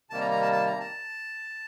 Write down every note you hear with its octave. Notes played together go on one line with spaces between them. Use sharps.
C3 D#3 G3 A#3 A5
A#5
A#5
A5
A5
A#5
A5